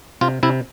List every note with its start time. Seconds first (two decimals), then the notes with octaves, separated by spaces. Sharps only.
0.21 C3 F4
0.43 C3 E4